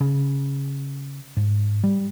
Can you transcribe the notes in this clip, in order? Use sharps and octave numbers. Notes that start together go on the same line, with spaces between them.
C#3
G#2
G3